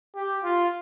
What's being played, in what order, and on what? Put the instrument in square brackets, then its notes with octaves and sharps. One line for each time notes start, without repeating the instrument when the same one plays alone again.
[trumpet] G4
F4